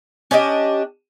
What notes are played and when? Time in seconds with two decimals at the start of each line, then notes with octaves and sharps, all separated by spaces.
0.31 C#4 D4 G4 D#5